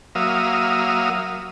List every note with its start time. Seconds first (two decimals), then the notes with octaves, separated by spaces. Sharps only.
0.15 F#3 A#3 E5 F5 D#6